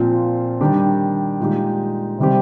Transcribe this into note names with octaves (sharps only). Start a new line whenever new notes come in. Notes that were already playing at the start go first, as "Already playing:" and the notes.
Already playing: A#2 F3 C4 F4 C5
D#3 G3 D4 G4
A#2 G#3 D#4 G4
C3 D#3 G3 C4 G4